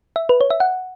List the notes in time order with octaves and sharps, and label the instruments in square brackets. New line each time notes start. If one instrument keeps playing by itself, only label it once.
[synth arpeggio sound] E5
B4
C#5
E5
F#5